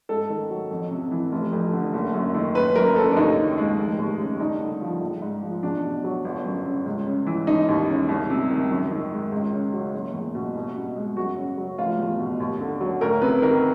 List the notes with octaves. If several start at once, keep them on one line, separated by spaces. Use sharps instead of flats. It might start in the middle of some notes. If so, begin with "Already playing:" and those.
G#2 A4
D#3
F#3
F2
C3
E3
F1
F2
D3
F#1
F#2
D#3
F#1 B4
F#2 A#4
C#3 A4
D4
D#2 D#4
D#3
G#3
F1
D#2
C#3
G2 D#4
D3
F3
A#1
G#2
F3
E2 D4
B2
F#3
G1
F#2
C#3
C#2
C#3
E3
E1 D#4
D#2
C#3
C2
C3
D#3
F#2
D#3
G#3
C#2
C#3
F#3
F#1
E2
B2
C2
B2
G#3
F#2 F#4
C#3
F#3
F1 F4
E2
B2
D#2
D3
F#3
D2 A#4
C3 B4
D#3 A#4